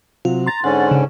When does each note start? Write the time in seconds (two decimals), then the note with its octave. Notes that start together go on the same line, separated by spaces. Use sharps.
0.25 C3 F#3 F4
0.46 A#5 C6 A6
0.64 G#2 D3 C#4 F#5
0.91 C#3